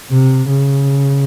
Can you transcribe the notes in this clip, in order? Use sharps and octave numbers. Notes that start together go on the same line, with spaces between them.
C3
C#3